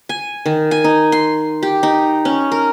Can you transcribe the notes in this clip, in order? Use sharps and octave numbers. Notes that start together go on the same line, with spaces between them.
G#5
D#3
G#5
D#4
C6
G4
D#4
C#4
A#4